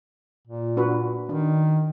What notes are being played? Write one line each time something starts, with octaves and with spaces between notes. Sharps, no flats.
A#2
D4 F#4 B4
D#3 D4